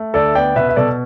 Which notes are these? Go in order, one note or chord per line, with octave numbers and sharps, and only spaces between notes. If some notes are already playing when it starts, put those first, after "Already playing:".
Already playing: A3
D2 A4 D5
B3 D5 G5
B2 B4 E5
E5
B2 A4 D5